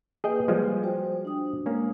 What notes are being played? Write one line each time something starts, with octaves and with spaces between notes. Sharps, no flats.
A#3 G#4 B4 D#5 G5
F3 G3 G#3
F#4 C5 G5
D4 D#6
G#3 A#3 C#4